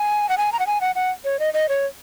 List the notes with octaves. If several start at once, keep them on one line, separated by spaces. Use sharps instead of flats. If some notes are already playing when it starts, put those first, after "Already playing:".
Already playing: G#5
F#5
G#5
A#5
F#5
G#5
F#5
F#5
C#5
D#5
D#5
C#5